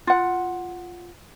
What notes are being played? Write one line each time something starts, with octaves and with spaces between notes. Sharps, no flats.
F4 F#5